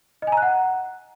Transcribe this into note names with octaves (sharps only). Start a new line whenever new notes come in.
D#5
G#5
A#5
F#6
F#5